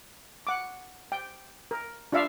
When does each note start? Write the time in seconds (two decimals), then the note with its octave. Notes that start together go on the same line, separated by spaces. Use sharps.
0.47 F#5 D6
1.12 G5
1.71 A#4
2.12 D4 F4 D5 E5 F5